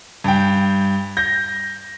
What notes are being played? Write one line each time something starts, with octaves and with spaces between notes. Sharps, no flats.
G2 G5
G6 A#6